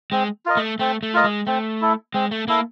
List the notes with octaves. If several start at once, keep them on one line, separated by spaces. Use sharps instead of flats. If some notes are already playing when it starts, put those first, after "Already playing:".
G#3 C4
F4 A#4 D#5
A3
A3 C4
A3
F4 A#4 D#5
G#3
A3 C4
E4 A4
G#3 C4
A3
A#3 E4 A4